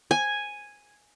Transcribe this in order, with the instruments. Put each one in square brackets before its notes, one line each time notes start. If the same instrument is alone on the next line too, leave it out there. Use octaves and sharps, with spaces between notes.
[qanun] G#5